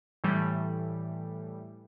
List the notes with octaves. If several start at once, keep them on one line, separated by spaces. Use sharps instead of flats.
A2 E3 G3